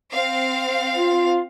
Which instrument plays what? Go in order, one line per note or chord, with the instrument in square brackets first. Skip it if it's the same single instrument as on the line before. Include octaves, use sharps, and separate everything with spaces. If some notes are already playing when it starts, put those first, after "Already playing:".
[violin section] C4 F5
[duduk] F4